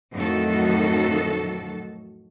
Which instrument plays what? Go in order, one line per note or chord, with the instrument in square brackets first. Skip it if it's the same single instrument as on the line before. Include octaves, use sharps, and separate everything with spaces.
[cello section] F2 A2 D#3 F#3 F#4 A4